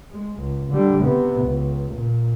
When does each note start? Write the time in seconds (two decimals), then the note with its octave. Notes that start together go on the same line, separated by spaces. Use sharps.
0.11 G#3
0.40 C#2
0.70 D3 G3
1.03 C3 B3
1.42 C#2
1.93 A#2